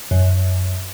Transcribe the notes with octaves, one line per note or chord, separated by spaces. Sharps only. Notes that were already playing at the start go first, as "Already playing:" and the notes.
F#2